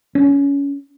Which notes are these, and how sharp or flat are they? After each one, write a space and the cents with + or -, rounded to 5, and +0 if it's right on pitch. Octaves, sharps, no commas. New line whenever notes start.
C#4 +20